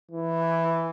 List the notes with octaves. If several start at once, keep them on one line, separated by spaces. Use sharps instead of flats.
E3